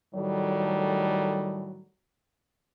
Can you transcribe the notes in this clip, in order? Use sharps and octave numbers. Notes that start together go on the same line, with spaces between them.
A2 D#3 F#3 G3 A3